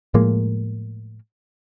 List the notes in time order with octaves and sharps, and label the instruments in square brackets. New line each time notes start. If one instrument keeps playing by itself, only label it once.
[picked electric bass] A2 F3 G#3 A#3